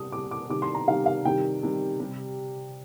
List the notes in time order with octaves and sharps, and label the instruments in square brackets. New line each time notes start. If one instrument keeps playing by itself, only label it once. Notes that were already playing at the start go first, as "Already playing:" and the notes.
Already playing: [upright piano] C3 G3 D#6
C3 G3 D6
D6
C3 D#3 G3 D6
C6
A#5
C3 D#3 G3 F5
F5
C3 D#3 G3 G5
C3 D#3 G3
C3 G3